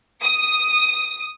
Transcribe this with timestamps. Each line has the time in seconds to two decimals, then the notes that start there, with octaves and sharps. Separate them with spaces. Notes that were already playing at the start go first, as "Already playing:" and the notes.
0.22 D#6